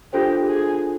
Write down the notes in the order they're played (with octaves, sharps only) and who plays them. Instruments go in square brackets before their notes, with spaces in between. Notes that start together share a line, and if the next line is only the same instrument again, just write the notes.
[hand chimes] D4 F4 A4 C5 [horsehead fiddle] G4
[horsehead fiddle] G#4